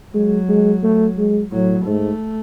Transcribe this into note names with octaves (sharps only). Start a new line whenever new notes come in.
F#3 G#3
G#3
A3
G#3
A2 F#3
G#2 A3